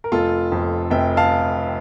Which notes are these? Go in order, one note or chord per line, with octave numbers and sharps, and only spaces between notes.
A#4
F1 F4 A4
F2
F1 E5 G5
F5 A5